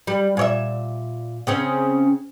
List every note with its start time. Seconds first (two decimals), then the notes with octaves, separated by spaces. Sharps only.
0.07 G3
0.37 A#2 C#5 E5
1.47 C#3 C4 C#4